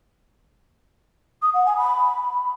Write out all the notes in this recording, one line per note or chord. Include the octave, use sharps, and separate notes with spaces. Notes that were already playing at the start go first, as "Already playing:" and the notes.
D#6
F#5
G#5
B5